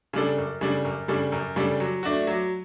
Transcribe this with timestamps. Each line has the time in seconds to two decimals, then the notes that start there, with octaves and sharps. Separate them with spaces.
0.13 C#3 G3 D4 A4
0.38 F#2
0.61 C#3 G3 D4 A4
0.85 F#2
1.08 C#3 G3 D4 A4
1.32 F#2
1.56 C#3 G3 D4 A4
1.80 F#3
2.03 A3 D4 F#4
2.27 F#3